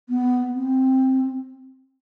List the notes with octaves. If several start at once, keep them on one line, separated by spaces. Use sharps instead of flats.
B3
C4